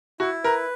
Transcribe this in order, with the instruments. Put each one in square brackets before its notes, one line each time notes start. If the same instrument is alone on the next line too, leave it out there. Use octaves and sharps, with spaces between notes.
[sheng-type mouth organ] E4 [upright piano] F#4
[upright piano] A#4 [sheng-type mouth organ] B4